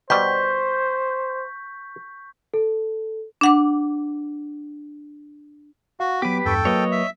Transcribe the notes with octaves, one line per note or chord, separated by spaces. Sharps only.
B2 G3 C5 C#6 G6 B6
A4
D4 F#5 D6
F#4 F5
F#3 B3 G4 B4 D6
E2 G2 A4 G5 C#6
F#3 A#3 B4 C#5 D#5
E5